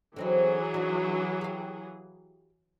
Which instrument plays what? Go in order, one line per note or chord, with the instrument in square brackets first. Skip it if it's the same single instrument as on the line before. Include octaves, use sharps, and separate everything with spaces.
[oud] D3 C4 D#4 [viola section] E3 F#3 G#4
[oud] D4 D#4
G4 F5